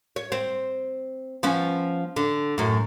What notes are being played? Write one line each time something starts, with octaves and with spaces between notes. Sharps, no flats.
C#5
C4
F3 B3 C#4
D3
F#2 A2